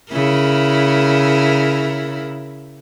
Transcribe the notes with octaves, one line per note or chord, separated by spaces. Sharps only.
C#3 E4 A#4